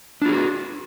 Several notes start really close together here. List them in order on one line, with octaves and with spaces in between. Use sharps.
D4 F4 G#4 F#4